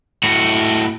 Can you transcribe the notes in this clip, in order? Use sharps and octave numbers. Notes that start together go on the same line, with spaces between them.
A2 F#4